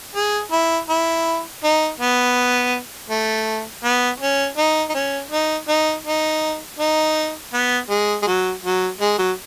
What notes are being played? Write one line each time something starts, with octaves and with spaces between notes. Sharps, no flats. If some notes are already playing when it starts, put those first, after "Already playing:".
G#4
E4
E4
D#4
B3
A3
B3
C#4
D#4
D#4
C#4
D#4
D#4
D#4
D#4
B3
G#3
G#3
F#3
F#3
G#3
F#3